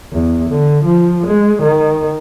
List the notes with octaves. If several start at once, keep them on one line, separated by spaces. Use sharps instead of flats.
E2
D3
F3
G#3
D#3